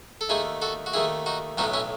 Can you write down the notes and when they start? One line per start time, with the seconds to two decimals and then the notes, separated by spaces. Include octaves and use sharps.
0.21 A4
0.29 D#2 D#3 A3 E4 G#4
0.62 F#4 A4
0.86 F#4
0.93 D#2 D#3 A3 E4 G#4
1.26 D#4 F#4
1.58 B1 A2 F#3 B3 D#4 F#4
1.73 C#4 E4